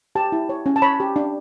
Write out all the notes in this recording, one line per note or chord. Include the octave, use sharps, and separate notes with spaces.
G4 A5
E4
C#5
C#4
A5
C#5 B5
G4
D4